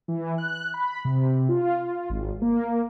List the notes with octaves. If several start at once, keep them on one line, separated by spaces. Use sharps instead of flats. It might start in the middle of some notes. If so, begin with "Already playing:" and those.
E3
F#6
B5
C3
F4
G#1
A#3